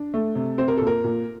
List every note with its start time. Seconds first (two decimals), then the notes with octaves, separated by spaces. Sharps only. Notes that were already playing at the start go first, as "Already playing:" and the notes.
Already playing: D4
0.14 A3
0.35 C3
0.58 C4 C5
0.68 A#4
0.77 A#2 A4
0.87 A#4
1.04 A#2